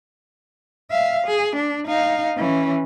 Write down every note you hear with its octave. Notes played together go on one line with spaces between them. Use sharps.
E5 F5
G#4
D4
D#4 F5
E3 C#4